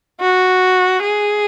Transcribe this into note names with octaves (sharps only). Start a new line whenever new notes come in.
F#4
G#4